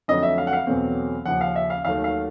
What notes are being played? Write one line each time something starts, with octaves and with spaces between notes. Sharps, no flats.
F2 D3 F#3 A3 C#4 D#5
E5
F5
F#5
F5
E2 B2 F#3 A3 C4
D#2 C#3 F3 F#5
F5
E5
F5
D#2 D#3 F#3 A3 F5
F5